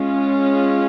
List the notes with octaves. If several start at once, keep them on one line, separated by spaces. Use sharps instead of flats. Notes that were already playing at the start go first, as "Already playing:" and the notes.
Already playing: G#3 C#4 F4